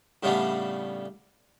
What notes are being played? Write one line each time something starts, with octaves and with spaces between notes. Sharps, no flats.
A2 C#3 G3 A3 B3 D4